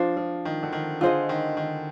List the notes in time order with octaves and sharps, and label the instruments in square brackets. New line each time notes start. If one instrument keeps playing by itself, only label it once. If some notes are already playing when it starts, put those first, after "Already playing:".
Already playing: [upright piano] F3 [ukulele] D4 F4 C5
[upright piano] F3
D#3
D3
D#3
[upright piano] D3 [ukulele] F4 G#4 C5 D#5
[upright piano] D#3
D#3